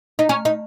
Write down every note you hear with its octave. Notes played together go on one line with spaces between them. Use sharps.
D#4
C#4
D#4